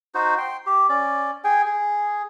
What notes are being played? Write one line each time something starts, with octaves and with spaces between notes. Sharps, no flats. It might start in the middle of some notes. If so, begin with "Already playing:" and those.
D#4 F#4 C5
G5 C6
G4
C#4 D5
G#4 G5 G#5
G#4